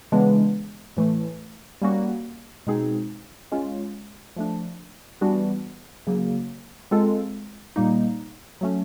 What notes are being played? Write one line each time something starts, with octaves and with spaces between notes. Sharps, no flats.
C#3 E3 G#3 B3 D4
A2 E3 A3
G3 A#3 C#4 F#4
B2 G#3 C4 D#4 G#4
G#3 C#4 F4
F3 A3 D4
E3 G3 B3 D4 F#4
C#3 F#3 A#3
G#3 C4 F4 A4
A#2 G3 A#3 D#4
F#3 A3 C#4